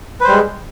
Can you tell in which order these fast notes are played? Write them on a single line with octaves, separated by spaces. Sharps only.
B4 C5 G3 G#3